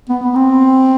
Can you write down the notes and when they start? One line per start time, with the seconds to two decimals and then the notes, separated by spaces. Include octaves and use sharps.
0.09 B3
0.23 B3
0.35 C4